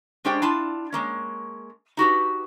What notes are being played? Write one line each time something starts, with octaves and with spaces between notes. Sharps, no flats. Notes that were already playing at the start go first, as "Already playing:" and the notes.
G#3 C#4 D4 G4 C5 G5
D4 E4 F4 A5
G#3 A#3 C#4
D#4 F#4 G4 B4